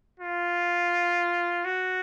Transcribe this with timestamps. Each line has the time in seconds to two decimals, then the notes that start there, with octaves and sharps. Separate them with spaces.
0.20 F4
1.65 F#4